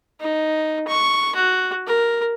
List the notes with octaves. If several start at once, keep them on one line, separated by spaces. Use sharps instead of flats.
D#4
C#6
F#4
A#4